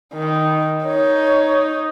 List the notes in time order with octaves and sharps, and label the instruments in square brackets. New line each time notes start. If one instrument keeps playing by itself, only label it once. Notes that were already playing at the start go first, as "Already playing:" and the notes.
[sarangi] D#3
[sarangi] D#4 [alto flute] C#5